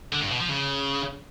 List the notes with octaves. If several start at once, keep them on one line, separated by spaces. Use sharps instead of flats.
D3
G2
B2
F3
C#3